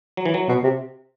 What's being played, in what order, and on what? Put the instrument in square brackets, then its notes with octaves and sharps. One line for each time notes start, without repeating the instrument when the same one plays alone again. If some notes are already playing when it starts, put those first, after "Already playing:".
[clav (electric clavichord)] F#3
E3
F#3
[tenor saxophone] B2
C3